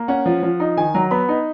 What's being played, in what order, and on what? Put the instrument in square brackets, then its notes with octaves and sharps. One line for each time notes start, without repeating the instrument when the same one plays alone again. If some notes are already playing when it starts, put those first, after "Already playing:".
Already playing: [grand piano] A#3
C#4 F#5
F3
F3
D#4
D#3 G#5
F#3 A#5
B3 B5
D#4